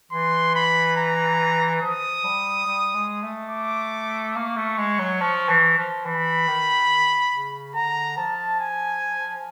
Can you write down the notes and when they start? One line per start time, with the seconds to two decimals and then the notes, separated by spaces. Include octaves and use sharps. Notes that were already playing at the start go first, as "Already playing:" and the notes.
0.12 E3 C6
0.55 B5
0.97 A#5
1.82 F3 D#6
2.24 G3
2.67 G3
2.95 G#3
3.23 A3
3.51 D6
4.36 A#3 C#6
4.57 A3
4.78 G#3
4.99 F#3
5.21 F3
5.49 E3
5.77 F3
6.06 E3 B5
6.48 D#3
7.33 C#3
7.75 D3 A#5
8.17 F3 A5
8.60 G#5